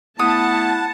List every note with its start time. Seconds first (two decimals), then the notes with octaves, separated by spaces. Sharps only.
0.19 A3 B3 E4 F#5 A5 D#6